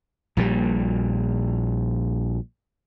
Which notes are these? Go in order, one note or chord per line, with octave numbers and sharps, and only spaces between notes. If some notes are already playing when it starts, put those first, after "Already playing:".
A#1 A#2 D3 G3